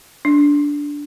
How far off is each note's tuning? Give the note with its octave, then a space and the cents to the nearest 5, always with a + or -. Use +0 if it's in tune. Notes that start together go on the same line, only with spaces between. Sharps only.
D4 -10